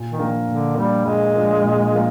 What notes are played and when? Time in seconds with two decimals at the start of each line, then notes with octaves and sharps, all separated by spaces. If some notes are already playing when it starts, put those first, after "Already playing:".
Already playing: A#2
0.10 D#3
0.18 F3 A#3 D4
0.48 A#2 D3
0.77 F3 G3 A#3 D4
1.05 A#2 G#3
1.35 F3 A#3 D4
1.64 A#2
1.92 F3 A#3